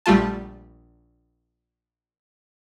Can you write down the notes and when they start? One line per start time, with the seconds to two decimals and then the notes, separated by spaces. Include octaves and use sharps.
0.06 A#1 G3 A3 F4 A5